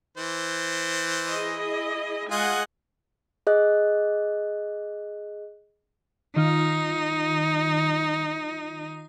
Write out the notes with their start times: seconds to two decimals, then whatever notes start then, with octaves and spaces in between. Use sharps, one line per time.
0.17 E3 C5
1.31 E4 G#4 D#5
2.31 G#3 F4 D#5 F#5 G#5
3.47 G#4 D#5 F#6
6.36 D#3 D#4 F4